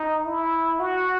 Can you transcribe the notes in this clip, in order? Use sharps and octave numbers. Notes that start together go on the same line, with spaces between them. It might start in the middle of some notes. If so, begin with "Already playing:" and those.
Already playing: D#4
E4
F#4